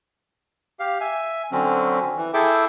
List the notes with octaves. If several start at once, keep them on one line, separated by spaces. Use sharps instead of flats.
G4 F5
E5 G#5
D3 F#3 C4 C#4
E3
E4 G#4 A4 E5 G5 D6